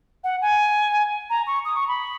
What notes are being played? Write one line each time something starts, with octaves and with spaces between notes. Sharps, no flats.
F#5
G#5
A#5
C#6
D#6
C#6
B5